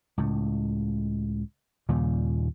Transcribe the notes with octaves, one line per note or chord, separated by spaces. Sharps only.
C#2 A2
D#2 A#2 C#3 G3